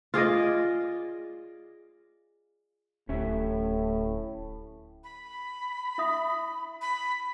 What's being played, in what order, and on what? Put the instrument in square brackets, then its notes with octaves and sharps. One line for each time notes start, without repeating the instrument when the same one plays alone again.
[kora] F4 G#4 D5 D#5
[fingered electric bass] D1 [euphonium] A2 [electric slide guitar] C#4 G4 E5
[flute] B5
[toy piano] E4 E5 D#6
[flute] B5